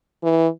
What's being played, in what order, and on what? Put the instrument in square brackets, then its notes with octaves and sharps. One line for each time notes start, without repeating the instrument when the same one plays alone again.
[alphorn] E3